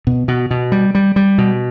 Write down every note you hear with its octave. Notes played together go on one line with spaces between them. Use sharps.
B2
B2
B2
G3
G3
G3
B2